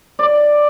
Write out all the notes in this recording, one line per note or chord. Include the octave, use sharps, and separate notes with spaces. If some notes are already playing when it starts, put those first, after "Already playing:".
D5